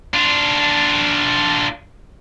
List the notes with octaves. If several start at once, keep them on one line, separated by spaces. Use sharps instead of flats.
D4 F4